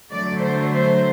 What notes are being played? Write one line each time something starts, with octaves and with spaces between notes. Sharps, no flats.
D3 F#3 A3 D5
C5
C5